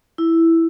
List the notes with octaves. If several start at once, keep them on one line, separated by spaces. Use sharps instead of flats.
E4